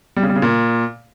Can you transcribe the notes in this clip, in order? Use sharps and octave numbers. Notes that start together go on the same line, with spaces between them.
G3
C#3
G3
C#3
A#2